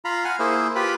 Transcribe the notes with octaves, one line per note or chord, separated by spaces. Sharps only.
F4 F5 A#5 B5
F5 F#5 G#5 F6
A#3 E4 G#4 C5
F4 G4 B4 B5